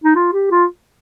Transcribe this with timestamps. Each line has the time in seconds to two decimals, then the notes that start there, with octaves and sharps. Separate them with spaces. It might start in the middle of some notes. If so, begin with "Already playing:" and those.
0.04 D#4
0.16 F4
0.33 G4
0.51 F4